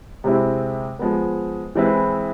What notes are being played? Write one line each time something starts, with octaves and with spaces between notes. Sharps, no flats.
C3 G#3 C4 E4
F3 G#3 B3
E3 G#3 C4 E4 B4